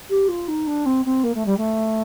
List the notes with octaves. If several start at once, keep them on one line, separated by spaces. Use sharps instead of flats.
G4
F4
D#4
D4
C4
C4
A#3
A3
G3
A3